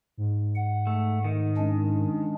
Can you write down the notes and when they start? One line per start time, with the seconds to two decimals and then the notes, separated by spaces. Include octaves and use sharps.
0.17 G#2
0.56 F#5
0.87 A3
1.24 D#3
1.57 G#3 C#4 D4